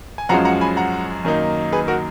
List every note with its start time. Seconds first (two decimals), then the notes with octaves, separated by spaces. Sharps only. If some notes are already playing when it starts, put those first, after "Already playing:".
0.18 G#5
0.29 F#2 F3 G#3 C#4 F#5 A#5
0.45 F#5 A#5
0.61 G#5 B5
0.77 F#5 A#5
1.25 F#2 D#3 A#3 D#4
1.72 G#4 B4
1.88 F#4 A#4